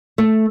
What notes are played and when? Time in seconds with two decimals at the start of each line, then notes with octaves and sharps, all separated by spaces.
0.18 A3